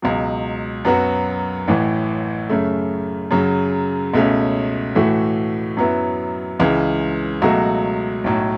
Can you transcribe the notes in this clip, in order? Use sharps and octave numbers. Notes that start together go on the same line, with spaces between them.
C#2 B2 F#3
F#2 F#3 B3 F#4
A1 A2 E3
F#2 C#3 A3
F#2 C#3 F#3
C#2 B2 A3 C#4
A2 E3 A3 F#4
F#2 F#3 B3 E4
C#2 C#3 E3
C#2 B2 F#3 A3 F#4
B1 A2 F#3